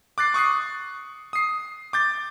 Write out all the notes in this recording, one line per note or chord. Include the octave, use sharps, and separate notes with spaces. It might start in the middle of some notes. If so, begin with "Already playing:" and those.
D6 F#6 A6 C7
C#6 D#6 F#6 C7
D#6 C7
D6 G6 A6